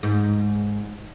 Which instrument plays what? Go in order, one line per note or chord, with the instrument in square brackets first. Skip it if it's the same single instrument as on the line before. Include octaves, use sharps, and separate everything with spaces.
[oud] G#2